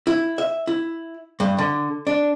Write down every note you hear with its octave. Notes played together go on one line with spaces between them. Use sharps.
E4
E5
E4
G2
D3
D4